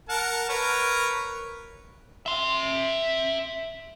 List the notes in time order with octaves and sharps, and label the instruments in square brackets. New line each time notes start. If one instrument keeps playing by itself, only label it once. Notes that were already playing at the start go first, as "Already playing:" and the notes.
[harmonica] A#4 F#5 A5
A#4 B4 C#5
[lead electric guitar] E5 C6